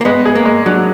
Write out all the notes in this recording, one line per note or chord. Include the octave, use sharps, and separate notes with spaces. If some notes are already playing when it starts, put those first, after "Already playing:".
A#3
G#3 B3
G#4
A#3
G#3
F#3 D4